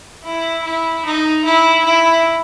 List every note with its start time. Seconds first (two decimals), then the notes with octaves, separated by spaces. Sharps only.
0.25 E4
0.65 E4
1.05 D#4
1.45 E4
1.85 E4